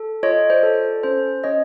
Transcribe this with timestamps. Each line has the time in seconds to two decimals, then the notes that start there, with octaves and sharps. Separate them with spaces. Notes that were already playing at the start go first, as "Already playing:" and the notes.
Already playing: A4
0.23 F4 C#5 D#5
0.50 C5 D5
0.63 A4
1.03 C#4 C5
1.44 C#4 C#5 D#5